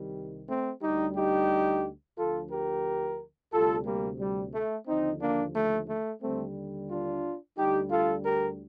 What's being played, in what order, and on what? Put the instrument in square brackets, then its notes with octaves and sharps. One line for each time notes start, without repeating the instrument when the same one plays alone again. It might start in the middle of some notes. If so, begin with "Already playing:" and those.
Already playing: [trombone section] C2 C3 D#3 G3
A3 C4
D2 D3 G3 D#4 G4
D#4 G4
D2 D3 F3 F4 A4
G4 A#4
D2 C3 G3 F4 A4
G3 A#3
G3
A3
D#2 D3 F3 C4 D#4
A#3 D4
A3
A3
D#2 D3 G3 A3 C4
D4 F4
D2 D3 G3 D#4 G4
F4 A4
G4 A#4